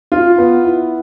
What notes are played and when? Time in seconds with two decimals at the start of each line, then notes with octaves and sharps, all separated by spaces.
0.12 F4
0.38 B3
0.64 E4